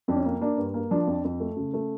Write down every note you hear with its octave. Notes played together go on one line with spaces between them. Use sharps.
F2 D4
C#4
A#3
A#3 D4
G2
A#3
F3 D4
F2
F2
A3
C#3
A3